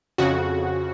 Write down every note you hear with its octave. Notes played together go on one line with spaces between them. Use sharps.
F2 C#3 F#4